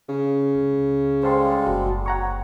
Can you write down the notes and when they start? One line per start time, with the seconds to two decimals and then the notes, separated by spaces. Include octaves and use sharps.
0.09 C#3
0.55 C#2
1.23 G3 G#3 A4 C5 F5 C6
1.66 F#1 D3 F#4
2.06 C4 C#5 F#5 A#5 C#6